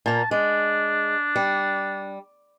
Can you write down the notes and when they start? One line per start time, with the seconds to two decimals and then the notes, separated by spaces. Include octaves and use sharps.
0.06 A#2 A#3 A5
0.31 G#3 D4
1.36 G3